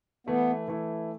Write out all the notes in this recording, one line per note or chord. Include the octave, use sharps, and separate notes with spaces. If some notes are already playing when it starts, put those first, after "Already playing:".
E3 A3 B3 E4
E3 A3 E4